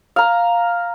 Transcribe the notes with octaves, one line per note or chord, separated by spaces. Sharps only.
F5 A#5